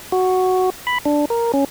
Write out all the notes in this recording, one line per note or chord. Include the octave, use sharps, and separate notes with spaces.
F#4
B5
D4
A#4
C#4